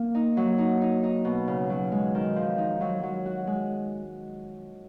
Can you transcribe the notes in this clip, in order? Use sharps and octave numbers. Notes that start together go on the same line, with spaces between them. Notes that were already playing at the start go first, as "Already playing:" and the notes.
Already playing: A#3
D#4
F#3
D#4
D#4
D#4
B2
C#3
F#3
G#3
D#3
F3
D#4
F#3
F#3
F#4
G#3